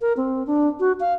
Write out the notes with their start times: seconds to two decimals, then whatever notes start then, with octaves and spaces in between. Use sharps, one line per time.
0.01 A#4
0.17 C4
0.47 D4
0.80 F#4
1.00 F5